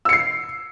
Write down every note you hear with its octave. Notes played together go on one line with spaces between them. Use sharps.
E6 C7 C#7